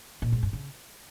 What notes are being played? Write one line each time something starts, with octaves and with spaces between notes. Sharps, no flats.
A#2
G#2
G2
C#3